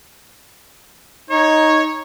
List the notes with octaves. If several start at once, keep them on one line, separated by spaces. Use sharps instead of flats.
D#4 C#5